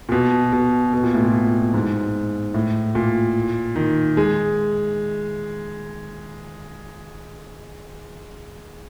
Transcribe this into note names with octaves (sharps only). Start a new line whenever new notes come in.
A#2
B2
B2
B2
A#2
A2
A#2
G#2
A2
A#2
D#3
G#3